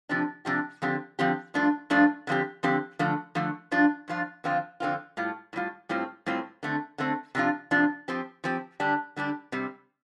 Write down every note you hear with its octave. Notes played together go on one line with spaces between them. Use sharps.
C3 F3 D4 G4
C3 F3 D4 G4
D3 F3 C4 G4
D3 F3 C4 G4
G2 F3 A3 D4 F4
G2 F3 A3 D4 F4
D3 F3 C4 G4
D3 F3 C4 G4
D3 F3 A3
D3 F3 A3
G2 F3 D4 F4
G2 F3 D4 F4
F2 D3 F3 C4 F4
F2 D3 F3 C4 F4
A2 G3 F4
A2 G3 F4
A2 G3 C4 F4
A2 G3 C4 F4
D3 A3 C4
D3 A3 C4
C3 F3 D4 F4
C3 F3 D4 F4
F3 C4 G4
F3 C4 G4
D3 G3 D4 G4
D3 G3 D4 G4
C3 G3 C4